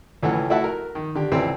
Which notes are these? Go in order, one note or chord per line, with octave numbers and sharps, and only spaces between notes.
C#2 E3 A3 C#4 F#5
A3 E4 F#4 E5 F#5 A5
A#4
D#3
D3 G4
C#2 E3 C4 A4 D5